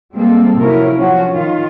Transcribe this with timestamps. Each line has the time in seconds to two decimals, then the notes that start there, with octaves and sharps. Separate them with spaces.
0.13 G3 G#3 A#3 C4 A4
0.58 C3 F3 F#3 C#4 E4 A#4
0.97 F3 C#4 F#4
1.31 D#3 F4